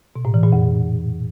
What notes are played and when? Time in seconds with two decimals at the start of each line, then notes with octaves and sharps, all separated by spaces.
0.16 B2
0.25 A2
0.34 E3
0.43 A#2
0.52 F2